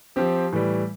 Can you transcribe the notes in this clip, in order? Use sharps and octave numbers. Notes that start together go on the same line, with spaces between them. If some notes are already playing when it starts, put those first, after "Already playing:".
F3 C4 G4
A2 E3 G3